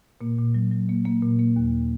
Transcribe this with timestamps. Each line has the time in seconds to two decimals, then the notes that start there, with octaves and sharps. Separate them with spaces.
0.21 A#2 A#3
0.39 A#2
0.55 F#3
0.71 F#3
0.89 A#3
1.05 A#3
1.23 A#2
1.39 A#3
1.56 D#2